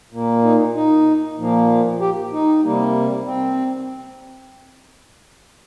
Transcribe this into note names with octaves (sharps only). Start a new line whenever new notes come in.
A#2 A#3
D#4
D#4
A#2 F3 A#3
G4
D#4
C3 G3 A#3
C4